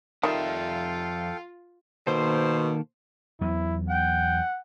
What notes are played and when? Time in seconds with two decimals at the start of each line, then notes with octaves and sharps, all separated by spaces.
0.23 F2 D#3 G3 F4 A4 E5 F5 G5
2.07 B2 D#3 A#3 A4 C5
3.41 E2 F#3 B3 E4
3.89 F#5 G5